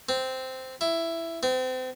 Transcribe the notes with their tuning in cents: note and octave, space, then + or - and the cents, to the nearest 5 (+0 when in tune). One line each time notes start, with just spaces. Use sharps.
C4 -10
E4 +10
C4 -35